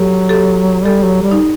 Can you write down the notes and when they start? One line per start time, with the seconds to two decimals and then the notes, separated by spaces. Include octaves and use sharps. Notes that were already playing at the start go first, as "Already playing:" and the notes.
Already playing: F#3 G4 A4
0.29 G4 A4
0.85 G3 G4 A4
1.04 F#3
1.22 G3
1.31 D#4